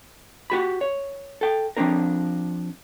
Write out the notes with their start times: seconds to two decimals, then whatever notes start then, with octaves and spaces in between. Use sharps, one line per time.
0.50 F#4 G4 B5
0.81 C#5
1.41 A4 G5
1.77 F3 G3 C4 D4 A#4